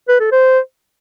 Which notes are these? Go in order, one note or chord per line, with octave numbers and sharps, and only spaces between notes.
B4
A4
C5